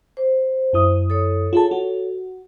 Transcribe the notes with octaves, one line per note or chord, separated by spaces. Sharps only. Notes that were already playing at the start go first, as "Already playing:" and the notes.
C5
F#2 E4 D#6
A4 C#5
F4 G#4 A5
F#4